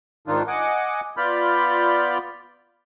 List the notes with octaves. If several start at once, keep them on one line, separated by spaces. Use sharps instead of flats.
G#2 D#3 D4 D#4 F4
D#5 F#5 G#5 D6
B3 F4 D5 B5 F6 G6